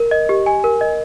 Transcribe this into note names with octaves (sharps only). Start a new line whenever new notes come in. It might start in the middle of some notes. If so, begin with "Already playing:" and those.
Already playing: A#4
D#5
G4
G#5
A#4
D#5